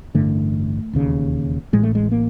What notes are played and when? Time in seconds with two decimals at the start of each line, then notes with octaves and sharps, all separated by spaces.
0.15 A1 G2 D3 A3
0.93 E1 D#2 C#3
1.73 A1 A2 G#3
1.83 A3
1.95 G#3
2.11 A#3